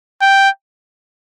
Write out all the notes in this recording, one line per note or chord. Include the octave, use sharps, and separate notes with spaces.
G5